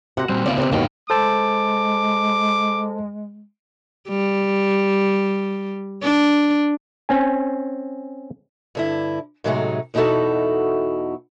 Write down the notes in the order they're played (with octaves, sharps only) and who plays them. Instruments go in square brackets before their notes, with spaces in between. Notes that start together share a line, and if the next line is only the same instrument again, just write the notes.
[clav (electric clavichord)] C3 C5 [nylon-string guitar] F#4 F#5
[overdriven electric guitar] A#2 G3 [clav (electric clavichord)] C4
[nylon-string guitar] D2 F4 D5 [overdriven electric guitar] C#3 B3
[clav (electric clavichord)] C3 C4 [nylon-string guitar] C5 D5
[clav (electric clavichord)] D#2 B2 F5 [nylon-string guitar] G#2 [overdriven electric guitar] D3 G5
[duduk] G#3 [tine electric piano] A4 C5 A5 [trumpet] D6
[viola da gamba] G3
D4
[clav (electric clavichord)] C4 C#4 G#5
[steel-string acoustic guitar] G2 D3 E4
A2 C3 F#3 G#3 A3 D#4
E2 B2 D#4 E4 F#4 A4